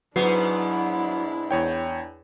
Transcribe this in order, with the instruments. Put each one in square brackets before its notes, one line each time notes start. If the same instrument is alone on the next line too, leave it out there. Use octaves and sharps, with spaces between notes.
[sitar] G#2 B3 [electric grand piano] F#3 C7 [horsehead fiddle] D4 E4
[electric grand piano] E2 C#5 G5